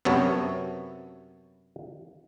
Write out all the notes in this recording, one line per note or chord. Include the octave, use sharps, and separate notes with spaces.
F#2 C3 B3 C#5 A5